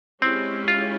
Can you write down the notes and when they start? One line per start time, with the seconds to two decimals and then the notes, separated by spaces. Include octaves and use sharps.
0.21 G#3 C4 C#4 E4 G4
0.68 F4